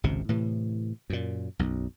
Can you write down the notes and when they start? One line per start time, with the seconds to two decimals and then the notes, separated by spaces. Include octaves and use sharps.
0.04 G#1 C#2 C3
0.29 A2 C3 E3
1.10 F#2 A#2
1.59 B1 F#2